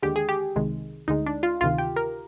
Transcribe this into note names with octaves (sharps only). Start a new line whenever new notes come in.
D#2 D3 G#3 G4
G#4
G4
C2 C3 D#3 G#3
D2 D3 G#3 D#4
D4
F4
D2 C3 D#3 F4
G4
A#4